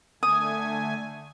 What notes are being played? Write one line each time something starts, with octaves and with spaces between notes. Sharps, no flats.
D3 A3 G#5 D#6